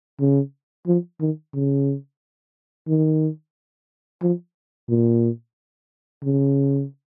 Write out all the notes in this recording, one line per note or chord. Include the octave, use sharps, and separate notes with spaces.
C#3
F3
D#3
C#3
D#3
F3
A#2
C#3